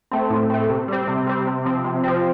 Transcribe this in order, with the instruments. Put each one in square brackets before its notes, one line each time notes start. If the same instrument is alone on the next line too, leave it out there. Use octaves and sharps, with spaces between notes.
[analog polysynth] A3 C4
A2
A3 C4
C3
G3 C4
C3
G3 C4
C3
F3 C4
C3
F3 C4